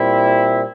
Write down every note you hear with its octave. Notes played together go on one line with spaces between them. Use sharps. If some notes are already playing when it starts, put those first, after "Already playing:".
Already playing: A#2 G3 C4 E4